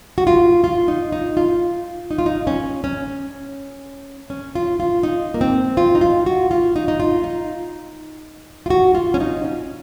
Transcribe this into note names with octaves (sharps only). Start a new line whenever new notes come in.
F#4
F4
F4
D#4
D#4
F4
D#4
F4
D#4
C#4
C#4
C#4
F4
F4
D#4
A#3
C4
F4
D#4
F4
F#4
F4
D#4
D#4
F4
D#4
F4
F#4
F4
C#4
D#4
C#4